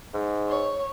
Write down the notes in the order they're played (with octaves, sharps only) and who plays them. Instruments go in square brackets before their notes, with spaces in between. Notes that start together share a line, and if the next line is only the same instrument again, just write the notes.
[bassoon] G#2
[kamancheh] C#5